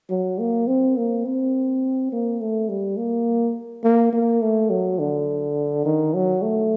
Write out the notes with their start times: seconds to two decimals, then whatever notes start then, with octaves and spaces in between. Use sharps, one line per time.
0.10 F#3
0.40 A#3
0.68 C4
0.97 A#3
1.25 C4
2.12 A#3
2.40 A3
2.69 G3
2.97 A#3
3.84 A#3
4.13 A#3
4.41 A3
4.70 F#3
4.99 D3
5.86 D#3
6.14 F#3
6.42 A3